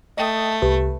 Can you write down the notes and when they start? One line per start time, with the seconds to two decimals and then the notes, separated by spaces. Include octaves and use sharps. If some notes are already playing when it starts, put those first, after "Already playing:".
0.17 A3 D#5 G5 D#6
0.62 C2 G4 B4